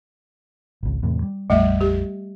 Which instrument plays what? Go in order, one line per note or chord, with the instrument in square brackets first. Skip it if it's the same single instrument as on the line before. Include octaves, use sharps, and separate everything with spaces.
[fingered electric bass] G#1 C#2
E2 A2 C3
G3
[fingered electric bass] A#1 F2 [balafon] G3 A3 E5
[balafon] G4